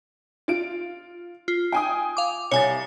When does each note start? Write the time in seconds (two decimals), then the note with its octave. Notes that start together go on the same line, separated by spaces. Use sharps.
0.48 F4 D7
1.48 F4
1.72 G5 G#5 D#6
2.17 F5 D6
2.51 C2 C#5 G#5 A6